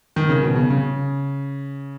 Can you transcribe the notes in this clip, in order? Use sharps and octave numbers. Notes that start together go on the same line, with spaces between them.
D#3
C#3
B2
C#3
C#3